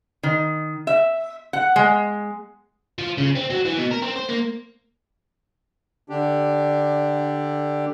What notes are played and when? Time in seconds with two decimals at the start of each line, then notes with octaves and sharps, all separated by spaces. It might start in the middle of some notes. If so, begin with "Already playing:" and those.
0.23 D#3
0.87 E5
1.53 F#5
1.76 G#3
2.98 F3
3.18 C#3
3.36 C4
3.51 F#3
3.66 E3
3.78 B2
3.91 A#4
4.02 C4
4.16 C5
4.29 A#3
6.10 D3 D4 G4